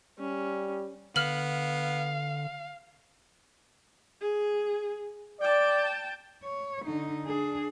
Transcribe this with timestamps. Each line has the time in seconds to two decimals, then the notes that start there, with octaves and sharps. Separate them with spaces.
0.19 G3 C#4
1.16 D3 B3 F5 F6 F#7
4.21 G#4
5.41 D5 G5 A5
6.44 C#5
6.85 D3 D#4
7.26 D4 G#4